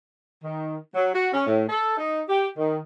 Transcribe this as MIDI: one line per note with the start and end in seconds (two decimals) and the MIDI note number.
0.43 0.76 51
0.94 1.12 54
1.13 1.26 66
1.32 1.44 61
1.46 1.63 45
1.68 1.95 69
1.97 2.19 63
2.28 2.47 67
2.56 2.77 51